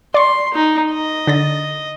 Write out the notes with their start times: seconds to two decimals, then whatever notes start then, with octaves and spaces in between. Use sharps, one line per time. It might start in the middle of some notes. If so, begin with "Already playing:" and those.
0.14 D5 C6 C#6
0.54 D#4
0.91 D#5
1.27 D3 A6 A#6